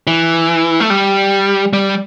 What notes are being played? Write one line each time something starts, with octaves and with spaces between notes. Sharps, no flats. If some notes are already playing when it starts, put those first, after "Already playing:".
E3
A3
G3
G3